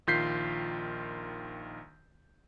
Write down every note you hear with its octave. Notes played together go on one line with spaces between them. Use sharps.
A#1 D#3 F4 G6 B6 C7